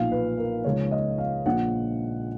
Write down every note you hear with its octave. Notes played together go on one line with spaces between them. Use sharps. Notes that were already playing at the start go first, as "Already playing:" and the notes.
Already playing: B1 A#2 F3 F5
B4
A#4
C#2 C#3 F3 C#5
D#5
F5
A#1 A#2 F3 F#5